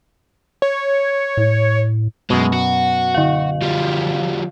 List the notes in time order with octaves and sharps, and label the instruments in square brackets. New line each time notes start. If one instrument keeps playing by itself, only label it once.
[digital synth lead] C#5
[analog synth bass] A2
[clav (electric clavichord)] F#2 B2 [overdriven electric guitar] G#3
[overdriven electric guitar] F#4
[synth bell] D3 F5
[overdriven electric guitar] F3 G3